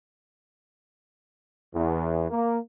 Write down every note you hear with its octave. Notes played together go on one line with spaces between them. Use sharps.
E2
A#3